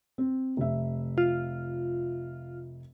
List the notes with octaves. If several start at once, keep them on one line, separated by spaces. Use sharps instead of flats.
C4
F1 E5
F4